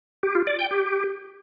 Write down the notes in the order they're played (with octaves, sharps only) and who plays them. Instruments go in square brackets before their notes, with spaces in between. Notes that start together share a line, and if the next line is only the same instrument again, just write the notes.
[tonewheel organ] G4
F4
D5
G5
G4